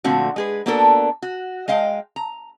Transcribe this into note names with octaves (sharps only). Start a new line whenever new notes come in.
A#2 D3 F3 A3 C4 F#4
G#3 G#4 B4
A#3 B3 D4 F#4 A4 A#4
F#4
G#3 D#5 F5 G5
A#5